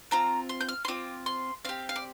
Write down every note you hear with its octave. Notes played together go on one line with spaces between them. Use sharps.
C4 F4 A#5
C6
G6
F6
C6
C4 F4 D6
C6
C4 G4 F5
F5
D5